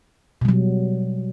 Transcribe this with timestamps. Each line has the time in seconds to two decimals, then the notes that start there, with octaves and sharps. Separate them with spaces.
0.42 B2
0.45 G3
0.48 F#3